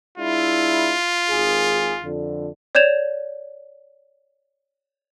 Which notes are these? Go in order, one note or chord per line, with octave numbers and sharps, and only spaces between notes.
G#3 D4 E4 F4
G#1 G#4
F2 D3
C#5 D5 G6 G#6 E7 F7